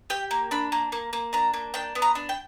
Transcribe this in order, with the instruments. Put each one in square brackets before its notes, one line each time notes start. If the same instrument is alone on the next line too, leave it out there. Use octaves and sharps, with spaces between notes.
[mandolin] G4 G5
A#3
D4 B5
A#3
A#3
A#3
D4 A#5
A#3
D4 G5
B3
A#5
D4
G5